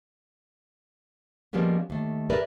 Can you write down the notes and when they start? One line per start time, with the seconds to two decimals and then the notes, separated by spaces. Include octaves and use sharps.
1.53 F3 G3 G#3 A#3 B3 C#4
1.90 D#2 A3
2.30 G4 G#4 A#4 B4 D5 E5